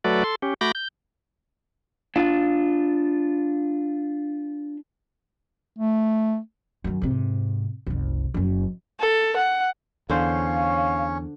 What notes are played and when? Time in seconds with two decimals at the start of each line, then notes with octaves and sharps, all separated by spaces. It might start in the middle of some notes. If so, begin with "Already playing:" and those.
0.05 F#3 A3 F#4 A4 B4 D5
0.24 A4 C6
0.42 C#4 G4
0.61 A3 F#4 B5 D6 G6 A#6
0.75 G6
2.16 D4 F4
5.79 A3
6.84 F#2 D#3
7.02 G#2 C3
7.87 F#1 C2
8.34 F#1 F#2
9.00 A4
9.37 F#5
10.10 E2 D3 C#4 C5 C#5 F5